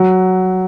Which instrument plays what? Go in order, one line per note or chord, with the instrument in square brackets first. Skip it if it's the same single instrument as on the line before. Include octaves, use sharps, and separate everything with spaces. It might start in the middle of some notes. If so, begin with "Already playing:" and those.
Already playing: [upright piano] F#3